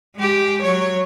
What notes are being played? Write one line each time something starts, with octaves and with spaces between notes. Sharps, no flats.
G#3 G4
F#3 C#5